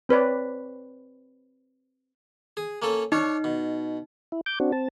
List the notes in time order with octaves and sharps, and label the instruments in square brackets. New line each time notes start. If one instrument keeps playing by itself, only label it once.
[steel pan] C4 B4 C#5 D5
[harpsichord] G#4
A#3 C#4 A4
[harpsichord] D4 C#5 [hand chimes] D#4
[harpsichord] B2
[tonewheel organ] E4
D6 G6
C4 D4 F#4
C4 A5